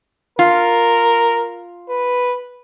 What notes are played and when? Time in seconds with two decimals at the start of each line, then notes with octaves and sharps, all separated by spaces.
0.39 F4 A#4
1.90 B4